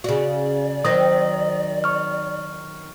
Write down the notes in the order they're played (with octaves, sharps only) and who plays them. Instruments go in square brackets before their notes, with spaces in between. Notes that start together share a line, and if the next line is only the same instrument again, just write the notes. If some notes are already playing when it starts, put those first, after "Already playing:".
[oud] C#3 F#4 [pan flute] D5
[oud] D#3 F#3 C4 [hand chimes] D#6 A#6
[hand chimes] C#6 F6